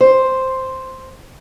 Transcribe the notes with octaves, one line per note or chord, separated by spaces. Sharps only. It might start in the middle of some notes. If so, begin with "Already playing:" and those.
C5